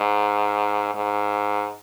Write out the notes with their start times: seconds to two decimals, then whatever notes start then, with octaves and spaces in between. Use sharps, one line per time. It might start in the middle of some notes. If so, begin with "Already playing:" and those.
Already playing: G#2
0.95 G#2